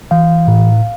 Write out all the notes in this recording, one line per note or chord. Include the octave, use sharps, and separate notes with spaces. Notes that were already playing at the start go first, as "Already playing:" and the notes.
E3 F5
A2